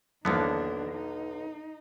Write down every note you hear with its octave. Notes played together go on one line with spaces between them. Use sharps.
B1 E2 D3 D#3 F3 A#3 B3 D4
D#4